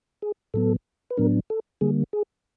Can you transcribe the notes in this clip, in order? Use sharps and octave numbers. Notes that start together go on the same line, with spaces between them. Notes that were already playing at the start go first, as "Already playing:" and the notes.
G#4
A2 F#3 B3 A4
B4
A2 F#3 B3 D4 A#4
A4
D3 G3 A#3 G#4
G#4